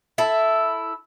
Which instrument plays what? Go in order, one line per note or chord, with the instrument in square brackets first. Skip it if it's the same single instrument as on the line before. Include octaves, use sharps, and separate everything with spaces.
[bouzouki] E4 A4